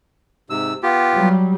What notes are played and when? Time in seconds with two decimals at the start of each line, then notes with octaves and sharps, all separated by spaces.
0.50 G#2 C3 E6
0.83 B3 F4 G4
1.13 F#3 G3